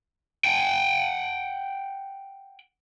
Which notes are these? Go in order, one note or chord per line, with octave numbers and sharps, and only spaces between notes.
F#5 G5